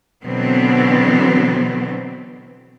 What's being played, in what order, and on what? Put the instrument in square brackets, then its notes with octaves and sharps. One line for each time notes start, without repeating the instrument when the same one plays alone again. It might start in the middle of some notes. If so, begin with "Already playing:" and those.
[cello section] B2 D3 E3 F#3 B3 C4